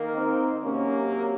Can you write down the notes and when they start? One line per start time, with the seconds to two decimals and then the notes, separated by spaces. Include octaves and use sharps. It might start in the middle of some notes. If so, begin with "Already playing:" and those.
Already playing: D#3 A#3
0.14 C4 D#4
0.63 C3 F#3 A#3 C#4